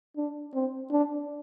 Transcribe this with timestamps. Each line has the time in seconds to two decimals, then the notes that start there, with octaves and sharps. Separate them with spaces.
0.17 D4
0.54 C4
0.91 D4